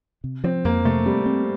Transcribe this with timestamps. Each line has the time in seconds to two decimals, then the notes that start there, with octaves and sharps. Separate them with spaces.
0.24 C3
0.44 F3 C4
0.64 F2 A#3
0.85 C3 A3
1.06 G3 C4
1.26 C4